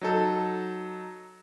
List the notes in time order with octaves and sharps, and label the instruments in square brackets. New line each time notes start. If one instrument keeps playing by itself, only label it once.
[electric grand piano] F#3 D#4 A4